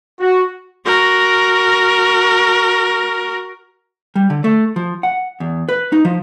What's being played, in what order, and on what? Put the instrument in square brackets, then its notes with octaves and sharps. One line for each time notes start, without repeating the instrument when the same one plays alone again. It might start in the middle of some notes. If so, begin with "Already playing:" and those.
[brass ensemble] F#4
[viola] F#4 A#4
[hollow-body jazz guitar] G3
D3
A3
F3
F#5
E2
B4
D#4
F3